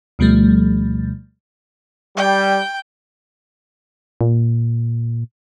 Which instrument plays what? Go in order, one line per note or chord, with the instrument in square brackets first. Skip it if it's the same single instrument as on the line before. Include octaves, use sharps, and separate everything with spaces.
[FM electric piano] D2 B2 F3 G3 A3
[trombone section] G3 [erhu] G5
[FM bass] A#2